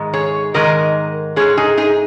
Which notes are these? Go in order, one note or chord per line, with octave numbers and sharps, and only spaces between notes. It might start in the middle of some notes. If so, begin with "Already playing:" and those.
Already playing: G#2 D#3 G#3
G#4 C#5
G#2 D#3 G#3 A#4 D#5
G#2 G#3 G#4 C#5
D#4 G#4
D#4 G#4